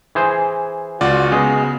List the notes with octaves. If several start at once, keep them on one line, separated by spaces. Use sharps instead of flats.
E3 G#4 C5
C#2 F4 F#4 D5
C#3 G#3 B3 D#5